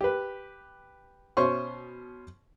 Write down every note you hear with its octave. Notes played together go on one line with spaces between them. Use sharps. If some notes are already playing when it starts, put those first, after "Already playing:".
G4 B4
B2 C#4 C5 C6 C#6